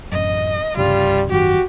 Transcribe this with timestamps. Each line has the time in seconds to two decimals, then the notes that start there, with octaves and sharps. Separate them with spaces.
0.12 A1 F#2 D#5
0.77 C2 G2 C#3 G3 F4
1.30 G#1 F#2 D#3 F#4 G4